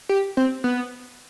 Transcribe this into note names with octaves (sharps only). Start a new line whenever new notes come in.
G4
C4
B3